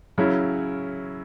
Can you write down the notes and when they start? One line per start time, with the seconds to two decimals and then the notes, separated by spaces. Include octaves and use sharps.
0.18 C#3 F#3 C#4 E4